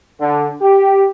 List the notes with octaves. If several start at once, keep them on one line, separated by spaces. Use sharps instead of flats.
D3
G4